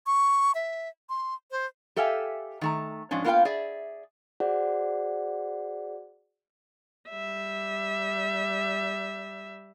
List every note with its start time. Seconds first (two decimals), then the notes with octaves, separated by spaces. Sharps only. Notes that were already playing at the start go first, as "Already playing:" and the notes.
0.06 C#6
0.55 E5
1.09 C6
1.51 C5
1.96 G4 A4 E5 F5 G5 G#5
2.61 D#3 A3 A#5
3.11 G#2 F3 C#4 D4
3.24 A#3 B3 F4 B4 F5 G5
3.45 G#4 D5 E5
4.40 F#4 G#4 C5 D5 F#5
7.10 G3 E5